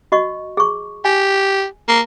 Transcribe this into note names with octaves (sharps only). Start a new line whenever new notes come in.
F#4 D#5 C#6
G#4 C#6
G4 G#5
A#3